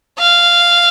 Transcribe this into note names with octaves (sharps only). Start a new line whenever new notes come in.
F5